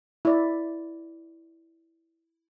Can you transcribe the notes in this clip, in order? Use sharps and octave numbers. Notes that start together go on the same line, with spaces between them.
E4 D5